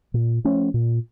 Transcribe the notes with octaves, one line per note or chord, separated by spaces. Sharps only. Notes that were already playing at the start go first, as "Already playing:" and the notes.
A#2
F3 A3 C#4
A#2